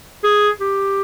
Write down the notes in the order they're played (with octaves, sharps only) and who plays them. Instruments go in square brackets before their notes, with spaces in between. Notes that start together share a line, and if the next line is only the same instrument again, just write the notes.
[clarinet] G#4
G4